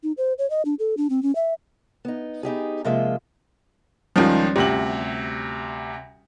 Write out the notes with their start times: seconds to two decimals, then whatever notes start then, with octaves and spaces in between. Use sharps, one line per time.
0.03 D#4
0.18 C5
0.38 C#5
0.50 D#5
0.65 D4
0.79 A4
0.97 D4
1.10 C4
1.23 C#4
1.35 E5
2.05 B3 D#4
2.43 B3 D#4 G4 G#4
2.85 C3 F3 G#3 A#3 F4 E5
4.16 C#2 D#3 F3 G3 C#4 F4
4.56 D2 C3 G4 F#7